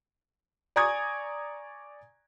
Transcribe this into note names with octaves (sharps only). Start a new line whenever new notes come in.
D5 G#5 A#5 C#6 D#6 G#6